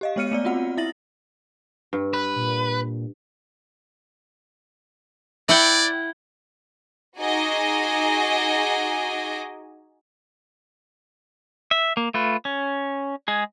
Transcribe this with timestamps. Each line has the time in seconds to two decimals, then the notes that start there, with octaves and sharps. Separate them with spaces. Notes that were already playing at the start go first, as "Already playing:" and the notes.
0.01 G4 D#5 F5
0.16 G#3 B3 C#5 F6 C#7 D#7
0.31 A3 B3 D5
0.44 C4 F4 F#4 F#5
0.77 E4 E5 A6 A#6 F#7
1.93 G2
2.14 B4
2.35 A#2
5.49 E4 D5 F#5 G5
7.20 D#4 F#4 G#4 D#5 G#5 D6
11.71 E5
11.97 A#3
12.14 A3 F4 B4
12.45 C#4
13.28 G#3 G#4